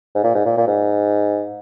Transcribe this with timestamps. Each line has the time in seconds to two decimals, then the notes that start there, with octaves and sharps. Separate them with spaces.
0.15 G#2
0.23 A#2
0.34 G#2
0.45 A#2
0.57 A#2
0.67 G#2